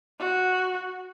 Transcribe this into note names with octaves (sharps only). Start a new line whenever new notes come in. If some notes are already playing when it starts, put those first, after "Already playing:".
F#4